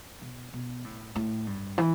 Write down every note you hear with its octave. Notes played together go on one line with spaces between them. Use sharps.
B2
B2
A2
A2
G2
E3